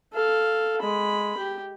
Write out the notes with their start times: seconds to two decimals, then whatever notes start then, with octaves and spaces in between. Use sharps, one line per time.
0.13 A4 F5
0.81 G#3 B5
1.37 G4